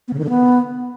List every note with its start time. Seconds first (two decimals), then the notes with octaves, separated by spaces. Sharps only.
0.08 B3
0.13 C#3
0.19 D#3
0.24 D3
0.29 B3